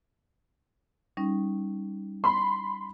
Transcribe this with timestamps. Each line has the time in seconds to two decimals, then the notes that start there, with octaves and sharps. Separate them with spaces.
1.17 G3 C#4 D#4
2.24 B5 C6